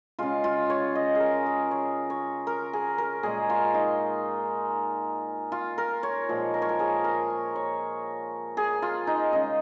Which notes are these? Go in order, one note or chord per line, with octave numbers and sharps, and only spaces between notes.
C#3 G#3 F4
F4
C#5
D#5
G#4
A#4
A#4
C#5
C#5
A#4
G#4
A#4
A#2 G#3 G#4
F4
D#4
F4
A#4
C#5
A#2 F3 G#3
A#4
C#5
A#4
G#4
A#4
C#5
C#5
G#4
F4
D#4
C#3 G#3 D#4